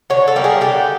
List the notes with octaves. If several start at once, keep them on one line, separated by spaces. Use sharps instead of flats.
D3 C#5
A4
G3 A#3
G#4
D3 G4